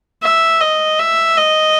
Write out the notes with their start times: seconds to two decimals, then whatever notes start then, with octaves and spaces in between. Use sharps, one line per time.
0.23 E5
0.61 D#5
0.99 E5
1.37 D#5